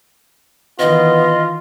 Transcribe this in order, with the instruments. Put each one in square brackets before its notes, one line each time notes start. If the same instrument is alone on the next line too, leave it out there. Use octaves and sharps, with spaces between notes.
[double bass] D#3 E3 [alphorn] B3 [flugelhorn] F4 [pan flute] D#5